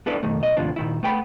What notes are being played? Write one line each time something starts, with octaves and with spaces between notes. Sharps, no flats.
B3 D4 E4 A4 B4 D5
B1 F2 D#3 A3
B1 D#5
D#2 A2 C3 F3 D4
A#2 D#3 E4
A3 B3 G5 G#5 B5